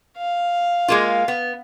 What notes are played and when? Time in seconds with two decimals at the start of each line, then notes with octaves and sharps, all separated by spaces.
0.17 F5
0.88 G#3 A#3 F4
1.28 B3